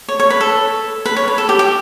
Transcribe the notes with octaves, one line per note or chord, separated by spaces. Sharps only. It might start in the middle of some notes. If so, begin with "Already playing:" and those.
C#5
C#5
B4
A4
B4
C#5
B4
A4
G4
G4